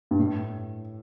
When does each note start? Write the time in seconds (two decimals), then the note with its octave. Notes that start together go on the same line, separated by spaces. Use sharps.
0.11 G2
0.19 A2